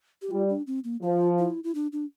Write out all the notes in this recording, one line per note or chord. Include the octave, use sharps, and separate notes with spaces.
G4
G3 F4
D4
C4
A#3
F3 F4
E4
E4
D4
D4